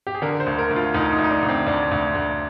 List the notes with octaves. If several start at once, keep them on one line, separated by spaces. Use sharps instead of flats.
G4
G#4
D3 A#4
C5
D2
A#4
D2
F4
D2 D#4
D#4
D2
D#4
D4
D2
C4
D2 D4
D2
D2